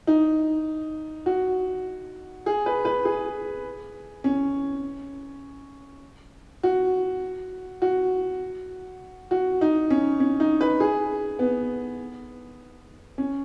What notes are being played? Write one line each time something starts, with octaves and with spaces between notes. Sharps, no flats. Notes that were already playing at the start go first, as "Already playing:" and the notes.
D#4
F#4
G#4
B4
B4
G#4
C#4
F#4
F#4
F#4
D#4
C#4
C#4
D#4
B4
G#4
B3
C#4